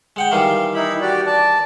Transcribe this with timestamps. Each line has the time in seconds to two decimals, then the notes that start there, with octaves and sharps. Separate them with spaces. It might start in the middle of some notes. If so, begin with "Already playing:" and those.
0.16 G#3 F#5 G5
0.32 D#3 E3 G3 F5
0.74 D#4 E4 B5
1.01 F#4 G4 D5
1.26 D5 A5